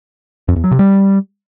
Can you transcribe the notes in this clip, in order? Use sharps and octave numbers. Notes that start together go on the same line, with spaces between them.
F2
E2
F#3
C3
G3